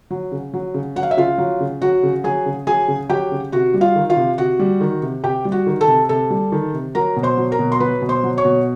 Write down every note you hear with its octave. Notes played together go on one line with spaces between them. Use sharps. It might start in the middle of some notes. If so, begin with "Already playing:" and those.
F#3
C#3
F#3
C#3
F#3 F#5
F5
E5
C#3 F4 F5
F#3
C#3
F#3 F#4 F#5
C#3
F#3 G#4 G#5
C#3
F#3 G#4 G#5
C#3
F#3 G4 G5
C#3
C3 F#4 F#5
G3
F4 F5
D#3
F4 F5
C3
C3 F#4 F#5
G3
D#3
C3
C3 G4 G5
G3
F#4 F#5
D#3
A4 A5
C3
C3 A4 A5
G3
D#3
C3
F#3 A#4 A#5
B2
C5 C6
F#3
A#4 A#5
B2
C6
F#3 B4 B5
B2
C5 C6
F#3
C#5 C#6
B2